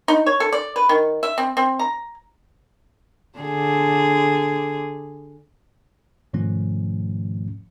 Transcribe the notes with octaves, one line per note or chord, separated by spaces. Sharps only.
D#4
C#5
A4
D5
B4
D#3
E5
C4
C4
A#5
D3 G#4
G#2 B2 D#3 F3 A3 C#4